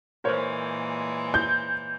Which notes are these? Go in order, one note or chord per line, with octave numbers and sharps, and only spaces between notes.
A#2 E3 G#3 A#4 C5 C#5
G6